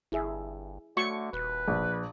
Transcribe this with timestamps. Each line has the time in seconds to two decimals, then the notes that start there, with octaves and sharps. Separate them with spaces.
0.12 G1 E4 G#4 E5
0.97 D3 A3 F#4 C#6 D6
1.33 D#1 B4
1.68 A#1